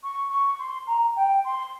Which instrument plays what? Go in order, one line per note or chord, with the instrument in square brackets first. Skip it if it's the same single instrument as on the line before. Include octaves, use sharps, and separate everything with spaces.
[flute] C#6
C#6
C6
A#5
G5
C6